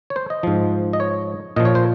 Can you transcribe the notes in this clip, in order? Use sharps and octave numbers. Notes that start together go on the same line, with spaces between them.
C#5
C5
D#5
G#2 F3
D#5
C#5
A#2 F3 D#5
C#5
C5